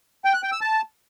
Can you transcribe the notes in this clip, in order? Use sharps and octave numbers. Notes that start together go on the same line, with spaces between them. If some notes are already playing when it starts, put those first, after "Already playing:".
G5
F#6
G5
E6
A5